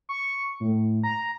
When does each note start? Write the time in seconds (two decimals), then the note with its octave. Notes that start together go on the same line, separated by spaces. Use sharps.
0.09 C#6
0.60 A2
1.04 A#5